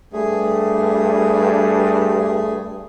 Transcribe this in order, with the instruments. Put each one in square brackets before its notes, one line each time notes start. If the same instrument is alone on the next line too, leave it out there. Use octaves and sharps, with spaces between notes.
[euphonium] G2 [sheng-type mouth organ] A3 G#4